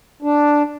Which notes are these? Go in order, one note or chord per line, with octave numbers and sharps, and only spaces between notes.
D4